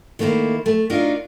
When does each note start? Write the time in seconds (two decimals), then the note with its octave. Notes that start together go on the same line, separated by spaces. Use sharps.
0.19 D#3 A3 A#3 E4 C5
0.66 A3
0.90 D4 D#4 F4 F#4 A#4